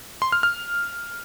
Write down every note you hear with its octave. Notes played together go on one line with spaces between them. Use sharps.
C6
F6
F6